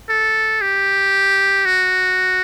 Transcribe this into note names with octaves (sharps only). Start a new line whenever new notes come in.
A4
G4
F#4